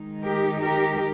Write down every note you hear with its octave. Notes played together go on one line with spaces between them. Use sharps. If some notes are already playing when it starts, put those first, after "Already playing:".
Already playing: D#3 G#3 D#4
G4 A#4
G4 A#4